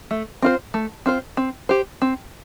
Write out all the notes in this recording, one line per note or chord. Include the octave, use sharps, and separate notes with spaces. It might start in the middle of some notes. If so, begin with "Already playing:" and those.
A3
C4 F4 C5
A3
C4 F4 C5
C4
G4 C5
C4